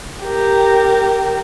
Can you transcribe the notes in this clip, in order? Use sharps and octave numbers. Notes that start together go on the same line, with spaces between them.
G4 A#4